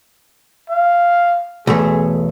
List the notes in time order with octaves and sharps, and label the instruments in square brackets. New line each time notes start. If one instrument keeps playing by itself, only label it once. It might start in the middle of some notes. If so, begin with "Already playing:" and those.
[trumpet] F5
[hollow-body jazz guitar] B1 E2 A3 [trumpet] G#4